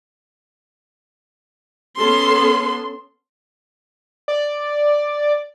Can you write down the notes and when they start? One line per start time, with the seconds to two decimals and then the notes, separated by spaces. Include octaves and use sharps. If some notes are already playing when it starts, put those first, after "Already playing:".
1.96 B3 C#4 A4 C6
4.28 D5